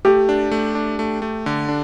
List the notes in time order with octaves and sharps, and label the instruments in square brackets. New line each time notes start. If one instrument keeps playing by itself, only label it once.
[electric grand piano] A3 [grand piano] G4
[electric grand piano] D4
A3
D4
A3
A3
D3
D4